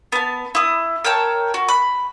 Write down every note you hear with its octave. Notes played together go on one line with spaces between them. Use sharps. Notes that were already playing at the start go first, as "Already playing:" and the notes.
B3 A5
E4 D#6
A#4 C#5 G5 A5
F#4
B5 F#6